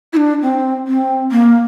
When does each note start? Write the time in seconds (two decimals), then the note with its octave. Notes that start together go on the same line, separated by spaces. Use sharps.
0.13 E4
0.17 D4
0.42 C4
0.87 C4
1.32 A#3